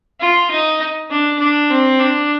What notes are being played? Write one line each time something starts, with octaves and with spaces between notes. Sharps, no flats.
F4
D#4
D4
D4
C4
D4